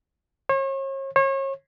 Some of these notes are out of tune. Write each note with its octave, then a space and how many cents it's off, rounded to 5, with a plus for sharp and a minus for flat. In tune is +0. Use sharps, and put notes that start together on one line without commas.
C#5 -40
C#5 -35